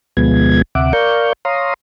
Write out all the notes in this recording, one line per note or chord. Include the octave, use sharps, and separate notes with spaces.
D2 B2 F3 G#3 B3 G#6
D2 C3 E5 F#5 D6
A#4 D5 F5 C#6 G6
C#5 F5 A#5 C6 D#6